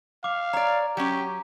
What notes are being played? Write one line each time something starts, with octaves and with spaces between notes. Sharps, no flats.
F5 D6
C#5 D5 A#5
F#3 C#4 G4